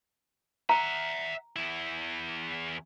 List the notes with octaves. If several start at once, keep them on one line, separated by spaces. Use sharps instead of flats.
E5 F#5 A#5
E2 E4